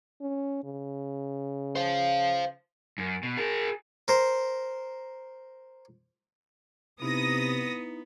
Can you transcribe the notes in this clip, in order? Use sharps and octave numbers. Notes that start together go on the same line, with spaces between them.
C#4
C#3
C5 F5
F#2
B2
G#4 A#4
A#4 C5
C3 B3 D#4 E4 D#6 A#6